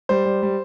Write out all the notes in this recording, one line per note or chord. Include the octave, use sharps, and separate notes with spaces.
G3 C5
G3
G3